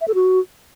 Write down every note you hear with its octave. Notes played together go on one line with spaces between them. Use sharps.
E5
A4
F#4